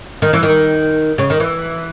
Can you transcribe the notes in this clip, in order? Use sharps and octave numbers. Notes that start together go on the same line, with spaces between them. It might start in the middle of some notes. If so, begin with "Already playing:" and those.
D#3
E3
D#3
C#3
D#3
E3